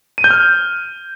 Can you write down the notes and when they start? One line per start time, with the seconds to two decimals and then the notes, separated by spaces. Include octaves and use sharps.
0.18 D#7
0.24 G6
0.31 F6